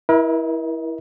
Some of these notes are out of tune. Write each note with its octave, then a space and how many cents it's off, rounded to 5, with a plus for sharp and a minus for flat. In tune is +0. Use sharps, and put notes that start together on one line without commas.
E4 -5 A#4 +40 D#5 +35